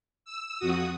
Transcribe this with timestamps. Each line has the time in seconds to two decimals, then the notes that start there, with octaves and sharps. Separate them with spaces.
0.25 E6
0.58 F2 F#4 D#6